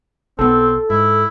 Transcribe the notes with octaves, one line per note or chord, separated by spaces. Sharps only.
B1 B3 C4 A4
G#2 E4